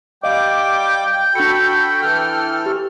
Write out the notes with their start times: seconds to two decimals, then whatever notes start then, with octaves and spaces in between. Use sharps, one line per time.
0.23 G3 D#5 F5 G5 D6
1.35 D4 F#4 A4 B5 C#7
2.02 E3 A4 F6
2.66 G4